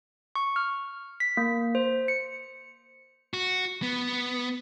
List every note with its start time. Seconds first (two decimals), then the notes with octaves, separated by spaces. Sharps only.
0.36 C#6
0.56 F6
1.20 B6
1.37 A#3
1.75 C5
2.08 C#7
3.34 F#4
3.82 B3